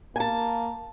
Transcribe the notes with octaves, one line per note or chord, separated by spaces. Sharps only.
A#3 G#5 A5